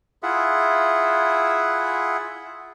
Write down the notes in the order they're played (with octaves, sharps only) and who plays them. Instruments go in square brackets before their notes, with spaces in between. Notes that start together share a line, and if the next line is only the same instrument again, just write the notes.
[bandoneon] E4 F4 G#4 E5 F#5